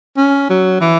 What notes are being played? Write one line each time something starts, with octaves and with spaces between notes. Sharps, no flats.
C#4
F#3
E3